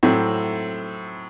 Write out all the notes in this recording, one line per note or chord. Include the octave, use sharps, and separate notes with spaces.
A2 F#3 C4 E4